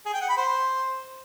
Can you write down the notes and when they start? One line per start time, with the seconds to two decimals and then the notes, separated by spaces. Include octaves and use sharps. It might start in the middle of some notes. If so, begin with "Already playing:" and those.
0.06 G#4
0.14 G5
0.21 F#5
0.29 B5
0.37 C5